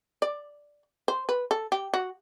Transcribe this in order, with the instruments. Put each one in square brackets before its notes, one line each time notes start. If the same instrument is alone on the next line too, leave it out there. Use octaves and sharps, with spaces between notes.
[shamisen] D5
C5
B4
A4
G4
F#4